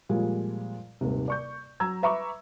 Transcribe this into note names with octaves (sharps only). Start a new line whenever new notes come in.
A#2 F3 G3 G#3
D#1 D#2 G#2 C3
D5 C#6 G6
F#3 A#5 E6 G#6
B4 E5 A#5 B5 C#6 D6